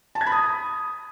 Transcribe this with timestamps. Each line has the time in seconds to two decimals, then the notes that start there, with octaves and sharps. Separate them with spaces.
0.15 A5
0.21 G#6
0.26 B5
0.32 D#6